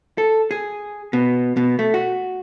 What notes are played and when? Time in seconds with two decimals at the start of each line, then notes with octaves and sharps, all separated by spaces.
0.18 A4
0.51 G#4
1.13 B2
1.57 B2
1.79 A3
1.94 F#4